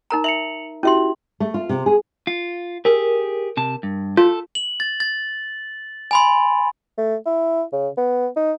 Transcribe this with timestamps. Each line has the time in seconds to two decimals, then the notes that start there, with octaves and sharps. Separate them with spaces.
0.10 D#4 A#4 A#5
0.24 E5 C#7 F7 F#7
0.83 C#4 E4 F#4 G4 E5 C6
1.40 A3
1.54 F4
1.69 C3
1.86 G#4
2.27 F4
2.85 G4 G#4 A#4
3.57 C3 A5
3.83 G2
4.17 F4 A4
4.55 F#7
4.80 A6
5.00 A6
6.11 G#5 B5 C6
6.98 A3
7.26 E4
7.72 C#3
7.97 B3
8.36 D#4